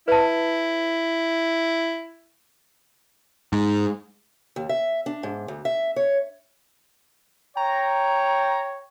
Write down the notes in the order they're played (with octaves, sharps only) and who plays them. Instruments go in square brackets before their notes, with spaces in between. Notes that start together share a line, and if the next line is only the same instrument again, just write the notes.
[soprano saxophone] E4 [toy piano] B4 A5
[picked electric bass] G#2
[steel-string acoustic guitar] D#2
E5
D4
G#2
D2
E5
C#5
[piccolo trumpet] C#5 [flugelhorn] G5 [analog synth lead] A#5